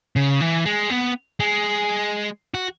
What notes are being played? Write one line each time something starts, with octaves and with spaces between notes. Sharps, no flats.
C#3
E3
G#3
B3
G#3
F#4